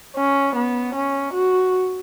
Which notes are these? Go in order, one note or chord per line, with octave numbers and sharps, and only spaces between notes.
C#4
B3
C#4
F#4